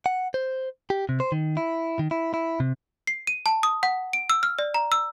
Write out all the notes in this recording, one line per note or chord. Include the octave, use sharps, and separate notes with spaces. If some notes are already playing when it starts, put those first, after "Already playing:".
F#5
C5
G4
C3
C5
D#3
E4
D#3
E4
E4
C3
C7
D#7
A5
D#6
F#5
D7
E6
F6
D5
A#5
E6